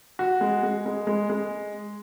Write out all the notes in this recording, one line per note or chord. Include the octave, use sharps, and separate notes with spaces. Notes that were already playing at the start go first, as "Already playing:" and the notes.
F#4
G#3
G#3
G#3
G#3
G#3